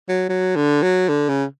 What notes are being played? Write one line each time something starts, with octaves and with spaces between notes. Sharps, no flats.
F#3
F#3
D3
F#3
D3
C#3